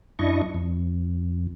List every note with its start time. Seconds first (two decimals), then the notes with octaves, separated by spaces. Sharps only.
0.19 F#2 D4 E4 D#5 C#6
0.54 F2